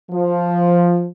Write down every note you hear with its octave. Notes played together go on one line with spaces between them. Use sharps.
F3